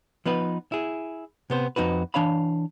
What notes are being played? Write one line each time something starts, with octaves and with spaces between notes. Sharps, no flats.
F3 B3 D#4 B4
E4 G#4
C3 B3 C5
F2 D#4 F#4 B4
E3 D4 C#5 F5 B5